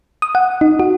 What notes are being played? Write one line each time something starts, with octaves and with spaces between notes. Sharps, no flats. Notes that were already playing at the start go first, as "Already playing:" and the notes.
D#6
F#5
D#4
F#4